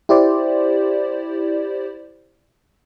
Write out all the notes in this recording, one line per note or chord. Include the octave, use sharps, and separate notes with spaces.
E4 G4 C5 D5